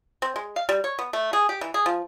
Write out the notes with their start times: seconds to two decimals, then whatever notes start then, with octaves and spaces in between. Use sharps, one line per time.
0.22 C4
0.36 G#3
0.56 F5
0.69 G3
0.84 C#5
0.99 B3
1.13 A3
1.33 G#4
1.49 G4
1.61 E3
1.74 G#4
1.86 F3